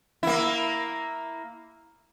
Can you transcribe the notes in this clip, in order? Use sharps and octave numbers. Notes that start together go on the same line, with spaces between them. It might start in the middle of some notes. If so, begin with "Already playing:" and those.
A#3 E4